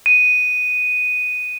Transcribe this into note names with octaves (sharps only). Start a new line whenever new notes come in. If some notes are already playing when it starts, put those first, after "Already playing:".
D#7